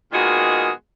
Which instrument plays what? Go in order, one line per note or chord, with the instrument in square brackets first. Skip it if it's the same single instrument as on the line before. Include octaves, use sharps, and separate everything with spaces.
[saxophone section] A#2 D#3 G#3 B3 F#4 G#4